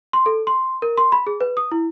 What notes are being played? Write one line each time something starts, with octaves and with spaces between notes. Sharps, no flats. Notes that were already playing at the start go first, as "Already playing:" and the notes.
C6
A4
C6
A#4
C6
B5
G#4
B4
D#6
E4